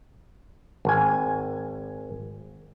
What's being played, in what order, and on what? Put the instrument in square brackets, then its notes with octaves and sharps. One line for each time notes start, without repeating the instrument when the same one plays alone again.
[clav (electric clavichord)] G#1 G#5